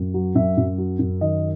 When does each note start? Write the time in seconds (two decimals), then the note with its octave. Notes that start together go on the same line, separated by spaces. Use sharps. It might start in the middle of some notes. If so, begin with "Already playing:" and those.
Already playing: F#2
0.14 F#3
0.35 F#2 E5
0.57 F#2
0.78 F#3
0.99 F#2
1.21 D#3 D#5